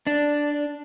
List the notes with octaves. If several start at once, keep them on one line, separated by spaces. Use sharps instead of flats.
D4 D5